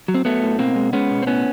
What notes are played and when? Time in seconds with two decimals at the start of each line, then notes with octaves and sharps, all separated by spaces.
0.08 F#3
0.14 C4
0.25 F#3 A3 B3
0.43 A2
0.59 B2 A#3 C4
0.76 G#3
0.93 G#3 B3 C#4
1.11 B2
1.23 C4
1.27 A2 B3 C#4